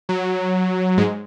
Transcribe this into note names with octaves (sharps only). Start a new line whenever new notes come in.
F#3
G#2 G#3